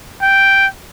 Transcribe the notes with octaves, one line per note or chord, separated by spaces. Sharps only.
G5